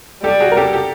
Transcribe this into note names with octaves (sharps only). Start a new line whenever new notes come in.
G3 G4 A4
F#4 G#4
A#4
G4 A4
G4 A4